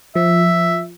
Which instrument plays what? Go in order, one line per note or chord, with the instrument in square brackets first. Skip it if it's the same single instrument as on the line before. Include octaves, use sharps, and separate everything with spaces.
[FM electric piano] F3 [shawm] E5